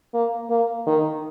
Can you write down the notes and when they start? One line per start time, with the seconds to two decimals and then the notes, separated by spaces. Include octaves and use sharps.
0.14 A#3
0.50 A#3
0.87 D#3